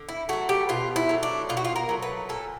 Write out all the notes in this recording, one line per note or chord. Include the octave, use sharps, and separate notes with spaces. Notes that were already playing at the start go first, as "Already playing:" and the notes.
Already playing: D3
E4
F#3 A3 F#4
G4
B2 F4
E4
F#3 A3
D4
B2 F4
F#4
F4
A#4
F#3 A3
B4
A#2 A4